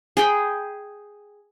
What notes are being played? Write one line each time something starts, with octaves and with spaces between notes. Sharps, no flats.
G#4 G5 B5